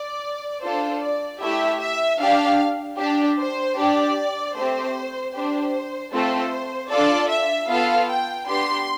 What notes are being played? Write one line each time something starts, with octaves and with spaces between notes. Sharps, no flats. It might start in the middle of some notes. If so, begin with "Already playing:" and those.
Already playing: D5
D4 F4 A4 C5
D5
A3 E4 G4 E5
E5
D4 G4 F5
D4 G4
C5
D4 G4 D5
A3 C4 G4 C5
D4 G4 C5
A3 C4 F4 A4 C5
D4 F4 A4 D5
E5
B3 F4 A4 F5
G5
B3 D4 G4 C6